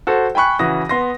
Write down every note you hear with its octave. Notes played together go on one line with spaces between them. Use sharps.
F#4 A4 C5
G5 G#5 B5 C#6 F#6
C#3 E3 F#4 D#6 A#6
B3 C6 A#6